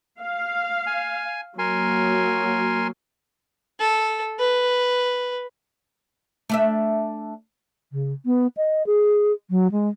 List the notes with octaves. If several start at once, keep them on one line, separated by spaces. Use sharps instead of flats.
F5
G#5
F#3 A#3 A#4 G#5 C6
A4
B4
A3 D4 E5
C#3
B3
D#5
G#4
F#3
G#3